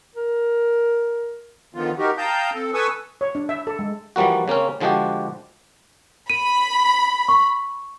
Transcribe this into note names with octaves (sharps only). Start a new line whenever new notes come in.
A#4
D3 D#3 F3 B3 F4
D#4 F#4 G4 A#4
F5 G5 A5 A#5 D#6 G6
C4 A4
A4 B4 G#5 C#6 D#6 E6
C#5
D4
E5
A4
G#3
E3 F3 G3 A#3 F#4
C#3 A#3 C4 C#4
D3 F3 G#3 D4 F#4 G4
B5 D#7
C#6